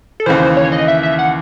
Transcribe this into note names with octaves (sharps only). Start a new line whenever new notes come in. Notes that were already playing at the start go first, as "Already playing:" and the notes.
A4
D#2 C#3 E3 C5
C#5
D#5
E5
E5
F#5